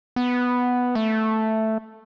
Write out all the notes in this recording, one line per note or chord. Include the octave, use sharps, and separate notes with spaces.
B3
A3